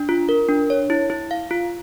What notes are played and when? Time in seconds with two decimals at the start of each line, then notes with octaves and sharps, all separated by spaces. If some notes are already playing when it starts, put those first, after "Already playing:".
Already playing: D4
0.09 F4
0.29 A#4
0.49 D4
0.70 C#5
0.90 E4
1.10 E4
1.31 F5
1.51 F4